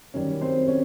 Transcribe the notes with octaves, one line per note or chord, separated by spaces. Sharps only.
F#2 D#3 G3 C#4 C#5
C4 C5
C#4 C#5